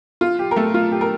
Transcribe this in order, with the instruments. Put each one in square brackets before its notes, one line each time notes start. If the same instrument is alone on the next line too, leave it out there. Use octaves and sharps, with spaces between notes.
[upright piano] F4
G4
A#4
A3 A4
F4
G4
A#4